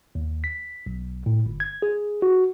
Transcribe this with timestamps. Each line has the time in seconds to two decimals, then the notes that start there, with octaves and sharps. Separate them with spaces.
0.15 D#2
0.44 B6
0.86 B1
1.26 A2
1.46 G1
1.60 G#6
1.82 G#4
2.22 F#4